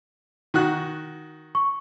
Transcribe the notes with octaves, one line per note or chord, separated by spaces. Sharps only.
D#3 F#4 F#6
C#6